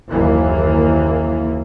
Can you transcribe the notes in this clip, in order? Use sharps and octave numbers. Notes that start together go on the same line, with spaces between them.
F#1 D#2 E3 A#3